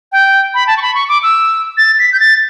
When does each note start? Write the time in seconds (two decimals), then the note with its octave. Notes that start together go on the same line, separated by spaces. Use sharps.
0.12 G5
0.54 B5
0.67 A5
0.77 C#6
0.82 B5
0.95 C#6
1.09 D6
1.23 E6
1.77 A6
1.99 B6
2.13 G6
2.20 A6